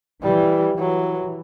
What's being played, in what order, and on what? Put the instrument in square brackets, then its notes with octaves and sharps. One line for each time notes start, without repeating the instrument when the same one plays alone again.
[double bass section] E3 [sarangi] G3
[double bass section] E3 [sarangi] F#3